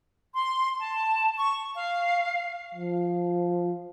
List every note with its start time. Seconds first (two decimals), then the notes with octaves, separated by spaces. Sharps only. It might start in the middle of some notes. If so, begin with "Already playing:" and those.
0.35 C6
0.79 A5
1.39 C#6
1.76 F5
2.74 F3